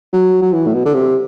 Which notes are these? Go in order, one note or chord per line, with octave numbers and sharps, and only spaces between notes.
F#3
F#3
E3
A2
B2
D3
C3